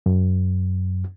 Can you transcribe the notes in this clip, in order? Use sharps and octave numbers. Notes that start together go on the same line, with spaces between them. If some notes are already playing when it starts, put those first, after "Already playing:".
F#2